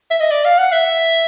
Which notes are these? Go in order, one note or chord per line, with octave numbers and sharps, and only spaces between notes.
E5
D#5
D5
F5
F#5
E5